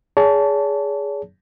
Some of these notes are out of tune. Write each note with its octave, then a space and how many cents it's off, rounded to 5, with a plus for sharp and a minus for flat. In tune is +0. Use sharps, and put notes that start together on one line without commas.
G#4 +0 C#5 +45 A5 +0